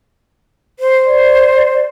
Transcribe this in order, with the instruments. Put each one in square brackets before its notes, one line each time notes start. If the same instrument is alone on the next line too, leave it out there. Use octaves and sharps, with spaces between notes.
[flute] C5
[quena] D5